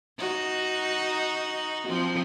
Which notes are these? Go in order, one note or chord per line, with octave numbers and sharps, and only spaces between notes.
D#4 F#4
F3 C4